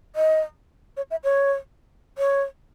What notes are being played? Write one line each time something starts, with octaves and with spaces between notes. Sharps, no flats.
D#5
C#5
E5
C#5
C#5